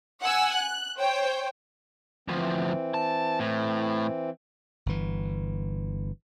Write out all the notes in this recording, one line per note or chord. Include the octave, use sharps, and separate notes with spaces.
F#5 G#5 E6
F#6
C5 C#5 G5
D2 E3 F3 C4
A5
A2
G1 E3